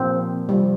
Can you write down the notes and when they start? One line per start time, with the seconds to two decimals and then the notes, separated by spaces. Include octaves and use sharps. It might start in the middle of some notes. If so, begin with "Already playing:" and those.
Already playing: A#2 F3 A#3 C4
0.49 C3 F3 G3 C4 F4